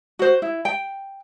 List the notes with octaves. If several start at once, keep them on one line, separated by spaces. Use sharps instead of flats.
F#4 C5
E4
G5